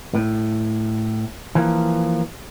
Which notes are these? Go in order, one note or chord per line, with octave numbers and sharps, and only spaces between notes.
A2
E3 F3 A#3